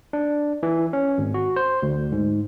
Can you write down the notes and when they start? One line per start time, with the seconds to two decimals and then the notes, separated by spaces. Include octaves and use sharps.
0.13 D4
0.63 E3
0.93 C#4
1.18 G#1
1.34 F#4
1.56 C5
1.82 D2
2.12 G#2